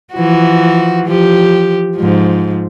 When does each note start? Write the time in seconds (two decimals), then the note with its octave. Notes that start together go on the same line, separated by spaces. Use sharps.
0.13 E3 F3 F#4
1.05 F3 G4
1.95 G#2 F3